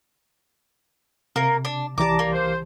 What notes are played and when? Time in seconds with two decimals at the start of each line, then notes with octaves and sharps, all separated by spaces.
1.36 C3 A#3 A#4
1.65 D4
1.98 C2 E3 G4 D5 A5 A#5 D6
2.19 A#3
2.32 C5